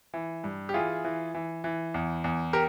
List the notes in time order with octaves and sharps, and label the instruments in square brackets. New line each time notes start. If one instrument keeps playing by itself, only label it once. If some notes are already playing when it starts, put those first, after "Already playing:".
[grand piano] E3
G2
G4
E3 F4 G#4
E3
E3
E3
E2
E2
G4 A#4